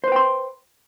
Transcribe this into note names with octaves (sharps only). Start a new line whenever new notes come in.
B4 C5 G5 C6